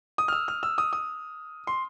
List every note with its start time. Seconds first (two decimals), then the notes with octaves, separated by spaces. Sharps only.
0.18 D#6
0.28 F6
0.33 E6
0.48 F6
0.63 E6
0.78 D#6
0.93 D#6
1.67 C6